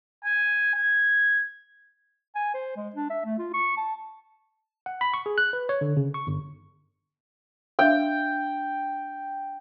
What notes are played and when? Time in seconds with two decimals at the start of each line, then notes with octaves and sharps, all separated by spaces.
0.24 G#5
0.75 G#6
2.35 G#5
2.54 C5
2.76 G#3
2.96 D4
3.10 E5
3.25 A3
3.39 F4
3.54 C#6
3.77 A5
4.86 F#5
5.01 B5
5.14 C#6
5.26 G#4
5.38 F#6
5.53 B4
5.69 C#5
5.81 D3
5.97 C#3
6.14 C#6
6.27 G1
7.79 D4 E5 F5 G5